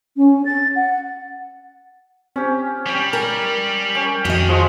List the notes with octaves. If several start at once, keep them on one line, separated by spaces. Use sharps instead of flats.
C#4
A6
F#5
C4 C#4 G4
G3 C#4 G5
A#4 F6
C#4 G5
F2 D#3 F#4 G4 D#5
D#3 F3 G#3 C#6